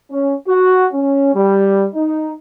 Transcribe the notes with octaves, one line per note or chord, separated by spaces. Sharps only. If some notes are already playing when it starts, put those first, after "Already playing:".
C#4
F#4
C#4
G3
D#4